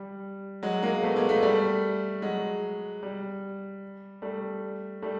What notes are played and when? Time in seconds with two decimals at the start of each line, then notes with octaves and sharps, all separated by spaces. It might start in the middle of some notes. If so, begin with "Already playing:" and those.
Already playing: G3
0.63 F#3 G#3
0.83 G#3 A#3
1.03 A3 B3
1.16 G#3 A#3
1.29 A3 B3
1.43 G3 A3
2.22 F#3 G#3
3.03 G3
4.22 G3 A3
5.02 G3 A3